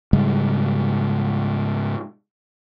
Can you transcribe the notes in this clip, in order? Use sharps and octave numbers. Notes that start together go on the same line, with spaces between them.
G#2 C#3 G3 G#3